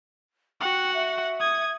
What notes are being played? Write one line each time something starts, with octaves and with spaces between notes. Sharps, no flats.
F#4 F#5 G5
E5
D#6 G#6